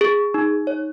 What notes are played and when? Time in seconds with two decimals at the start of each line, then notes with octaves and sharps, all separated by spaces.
0.01 G#4
0.34 D#4
0.67 C#5